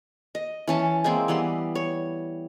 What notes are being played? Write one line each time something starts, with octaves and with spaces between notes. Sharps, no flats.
D#5
E3 C#4 A5
G#3 A#3 C4 E4
E3 G3 B3 C6
C#5